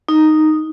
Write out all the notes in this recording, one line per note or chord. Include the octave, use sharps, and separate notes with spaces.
D#4